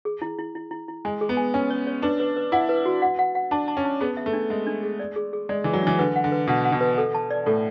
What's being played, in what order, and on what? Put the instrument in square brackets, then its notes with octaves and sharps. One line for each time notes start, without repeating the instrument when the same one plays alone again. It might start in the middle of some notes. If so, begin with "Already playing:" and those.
[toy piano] G#4
E4
E4
E4
E4
E4
[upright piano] G#3 [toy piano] G#5
[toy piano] G#4
[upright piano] B3
[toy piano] G#5
[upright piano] C#4 [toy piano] G#5
[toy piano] C#5
C#5
[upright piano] D4 [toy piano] B4
[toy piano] B4
B4
[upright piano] E4 [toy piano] F#5
[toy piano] B4
F#4
F#5
F#5
F#5
[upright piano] D4 [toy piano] A5
[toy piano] A5
[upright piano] C#4
[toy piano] A5
[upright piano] B3 [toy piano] G#4
[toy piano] E5
[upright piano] A3
[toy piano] D4
[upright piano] G#3 [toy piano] E5
[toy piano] D4
G#4
D5
G#4
G#4
[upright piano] G#3 [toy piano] D5
[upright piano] E3 [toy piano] G#4
[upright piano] F#3
[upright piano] E3 [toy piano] D4
[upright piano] D3 [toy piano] B4
[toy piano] F#5
[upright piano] D3
[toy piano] B4
[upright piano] B2 [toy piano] F#5
[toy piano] F#5
[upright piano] B2
[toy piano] B4
A4
A5
D5
[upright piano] A2 [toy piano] A4